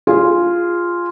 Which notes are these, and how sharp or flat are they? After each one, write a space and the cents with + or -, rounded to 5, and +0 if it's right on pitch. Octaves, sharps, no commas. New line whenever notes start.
F4 -5 G#4 -10